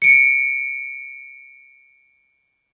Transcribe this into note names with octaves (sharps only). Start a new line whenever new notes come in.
C#7 D7